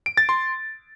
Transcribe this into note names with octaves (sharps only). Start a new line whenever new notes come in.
D7
A6
C6